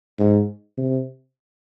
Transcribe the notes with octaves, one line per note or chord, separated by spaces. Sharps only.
G#2
C3